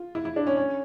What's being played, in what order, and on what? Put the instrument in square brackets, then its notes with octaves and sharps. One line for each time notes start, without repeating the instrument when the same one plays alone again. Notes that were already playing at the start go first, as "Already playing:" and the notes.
Already playing: [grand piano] F4
E4
E4
D4
C#4
C#4